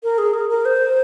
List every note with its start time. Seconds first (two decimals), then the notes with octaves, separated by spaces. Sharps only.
0.03 A#4
0.18 G#4
0.34 A#4
0.50 A#4
0.65 C5